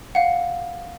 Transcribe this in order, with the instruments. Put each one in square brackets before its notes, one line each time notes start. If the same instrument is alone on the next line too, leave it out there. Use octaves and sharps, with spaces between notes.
[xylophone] F5 F#5